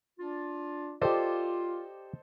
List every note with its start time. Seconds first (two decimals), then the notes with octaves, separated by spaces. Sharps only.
0.19 D4 F4
1.02 F4 G4 A4 C5 D5 D#5